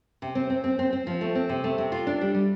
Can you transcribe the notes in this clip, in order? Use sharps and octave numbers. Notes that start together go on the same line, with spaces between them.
C3
C4
C4
C4
C4
C4
F3
A3
C4
C3
A3
C3
F4
D4
G3
G3